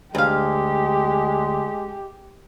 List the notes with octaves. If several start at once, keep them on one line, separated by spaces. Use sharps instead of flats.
D2 G#3 G4 F5